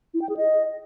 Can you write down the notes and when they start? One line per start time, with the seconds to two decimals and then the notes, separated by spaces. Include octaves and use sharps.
0.14 E4
0.22 G5
0.29 G#4
0.37 D#5